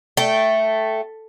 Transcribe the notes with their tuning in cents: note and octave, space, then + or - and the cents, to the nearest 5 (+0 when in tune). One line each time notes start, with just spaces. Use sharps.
A3 +0 G5 -15